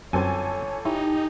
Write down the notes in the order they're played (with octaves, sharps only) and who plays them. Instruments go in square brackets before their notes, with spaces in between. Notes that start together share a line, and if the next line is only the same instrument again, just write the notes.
[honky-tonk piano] G1 A4 G#5 [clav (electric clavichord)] F#2 C4 [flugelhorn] C#5
[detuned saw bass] D#4 [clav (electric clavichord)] E4 C#5 [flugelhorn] G4